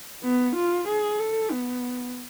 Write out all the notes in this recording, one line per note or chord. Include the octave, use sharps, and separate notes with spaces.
B3
F4
G#4
A4
B3